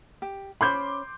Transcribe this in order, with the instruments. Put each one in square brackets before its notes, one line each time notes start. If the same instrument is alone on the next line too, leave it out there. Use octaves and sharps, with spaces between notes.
[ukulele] G4
[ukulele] C#4 C5 B5 [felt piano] C6 D6 G6